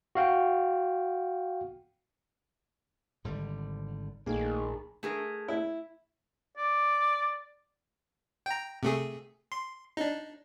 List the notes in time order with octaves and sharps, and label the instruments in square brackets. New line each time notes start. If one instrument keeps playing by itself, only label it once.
[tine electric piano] F#4 F5 G5
[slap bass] G#1 D3 G3
[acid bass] A#1 [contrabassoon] D#3 [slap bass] A3 A#3 [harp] G#4
[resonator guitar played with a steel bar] A3 G#4 A#4
[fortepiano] E4
[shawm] D5
[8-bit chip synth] G5 A#5
C3 A3 G#4
C6
D4 D#4